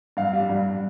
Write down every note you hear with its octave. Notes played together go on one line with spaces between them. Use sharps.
G2 F5
G3
G2